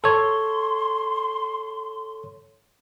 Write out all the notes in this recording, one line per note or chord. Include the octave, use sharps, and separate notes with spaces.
A4 C#5 C6